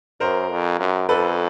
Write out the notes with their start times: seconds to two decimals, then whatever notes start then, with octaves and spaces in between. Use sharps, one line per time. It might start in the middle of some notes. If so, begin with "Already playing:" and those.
0.20 F#2 A#4 C5
0.50 F2
0.80 F#2
1.09 F2 A4 B4